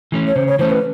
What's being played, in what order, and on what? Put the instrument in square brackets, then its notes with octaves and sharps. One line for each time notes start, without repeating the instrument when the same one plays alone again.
[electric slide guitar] E3 A3 C#4
[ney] C#5
[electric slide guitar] C#3 [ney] C5
[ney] C#5
[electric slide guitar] E3 A3 C#4 [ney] C5
[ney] B4